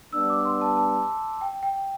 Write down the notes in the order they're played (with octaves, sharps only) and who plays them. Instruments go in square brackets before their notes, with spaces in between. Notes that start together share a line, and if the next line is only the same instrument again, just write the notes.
[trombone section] G3 B3 D4 [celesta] E6
[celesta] D6
C6
A5
A5
G5
G5